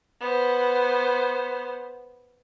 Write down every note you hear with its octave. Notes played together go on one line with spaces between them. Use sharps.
B3 C5